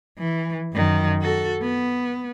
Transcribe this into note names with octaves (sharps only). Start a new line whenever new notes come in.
E3
F#2 D#3
F#4 A4
B3